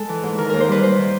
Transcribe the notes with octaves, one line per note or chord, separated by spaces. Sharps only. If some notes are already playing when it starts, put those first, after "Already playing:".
Already playing: G#3 A4
E3
G#2
D#3 A#4
D#2 A#4
C5
G3 B4
D#2 C5
D#3